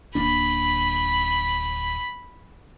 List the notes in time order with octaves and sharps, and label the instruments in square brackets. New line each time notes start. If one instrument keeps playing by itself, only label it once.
[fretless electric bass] D1 A#3 D4 [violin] B5